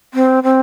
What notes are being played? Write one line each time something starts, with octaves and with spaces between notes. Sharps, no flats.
C4
C4